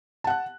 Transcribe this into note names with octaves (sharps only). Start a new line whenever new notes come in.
F#5 A5 F#6